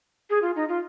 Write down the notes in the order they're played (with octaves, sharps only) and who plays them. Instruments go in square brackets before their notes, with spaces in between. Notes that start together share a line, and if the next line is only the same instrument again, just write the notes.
[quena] G#4
F4
D#4
F4